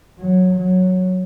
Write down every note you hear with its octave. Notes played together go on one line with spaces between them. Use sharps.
F#3
F#3